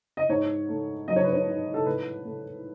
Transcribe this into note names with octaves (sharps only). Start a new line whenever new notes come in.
D#5
G#2 C#5
A3
F#3 D#5
C#5
B4
C#5
G#2
A4
A2 B4
A3